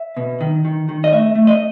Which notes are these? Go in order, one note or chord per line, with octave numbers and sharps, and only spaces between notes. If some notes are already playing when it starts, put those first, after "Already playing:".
Already playing: E5
B2
D#3
D#3
D#3
D#5
A3 E5
A3
D#5